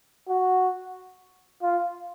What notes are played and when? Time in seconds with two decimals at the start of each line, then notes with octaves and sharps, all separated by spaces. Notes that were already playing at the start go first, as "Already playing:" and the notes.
0.29 F#4
1.62 F4